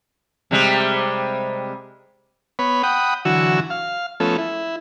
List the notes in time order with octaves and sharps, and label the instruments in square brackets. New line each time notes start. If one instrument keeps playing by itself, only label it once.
[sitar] C3 G3 G#3
[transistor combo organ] B3 C#5 B5
F#5 G5 B5 D#6
D3 E3 F#3 F#4 C#6 E6
F5
F3 A3 B3 C#4 A4
E4